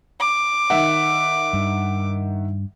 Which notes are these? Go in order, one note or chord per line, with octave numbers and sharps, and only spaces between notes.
D6
D#3 E5 F#5
G2